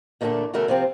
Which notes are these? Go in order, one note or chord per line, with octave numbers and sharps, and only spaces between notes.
E2 A#2 D3 A3 D4 A4
E2 C#3 F#3 A3 A4 A#4
C3 F3 C4